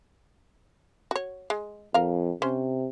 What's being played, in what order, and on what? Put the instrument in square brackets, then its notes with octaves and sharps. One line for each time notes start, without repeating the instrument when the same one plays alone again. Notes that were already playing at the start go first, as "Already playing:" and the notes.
[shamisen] F#4 C#5
G#3
[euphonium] F2 [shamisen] A#4 F5
[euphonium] C3 [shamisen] C#4 C5